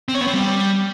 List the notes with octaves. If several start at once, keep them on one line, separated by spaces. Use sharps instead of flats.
C4
C#5
B3
C4
G3